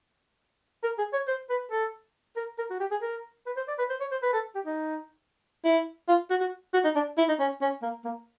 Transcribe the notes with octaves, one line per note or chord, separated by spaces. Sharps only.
A#4
G#4
C#5
C5
B4
A4
A#4
A#4
F#4
G4
G#4
A#4
B4
C5
D5
B4
C5
C#5
C5
B4
A4
G4
D#4
E4
F4
F#4
F#4
F#4
D#4
D4
E4
D#4
C#4
C#4
A#3
A#3